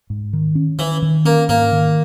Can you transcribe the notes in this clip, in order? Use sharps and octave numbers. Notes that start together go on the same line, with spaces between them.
G#2
D#3
C#4
D#3 E3
D#3
A#3 C#4
G#2 A#3
D#3